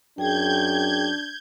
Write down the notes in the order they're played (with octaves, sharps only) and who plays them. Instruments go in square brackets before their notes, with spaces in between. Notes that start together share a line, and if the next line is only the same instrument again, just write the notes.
[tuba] F#2 [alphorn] D4 [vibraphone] G#4 G5 [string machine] G6 G#6